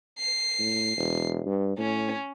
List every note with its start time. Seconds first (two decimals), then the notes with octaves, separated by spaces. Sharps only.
0.19 C7
0.59 A2
0.97 E1
1.46 G2
1.78 A2 C#4